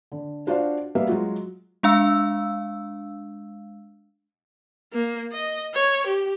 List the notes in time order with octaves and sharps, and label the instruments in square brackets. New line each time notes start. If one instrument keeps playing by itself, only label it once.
[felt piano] D3
D4 F4 F#4 C5 D5 F5
G3 A#3 B3 A#4 E5 F5
F#3 G#3 F4 F#4
[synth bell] G#3 D4 F5 E6
[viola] A#3
D#5
C#5
G4